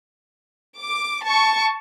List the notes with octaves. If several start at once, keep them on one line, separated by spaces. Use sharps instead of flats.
D6
A5 C#6